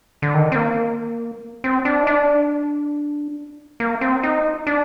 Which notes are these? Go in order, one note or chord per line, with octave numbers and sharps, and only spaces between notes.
D3
D#3
C4
A#3
C4
D4
D#4
D4
A#3
C4
D#4
D4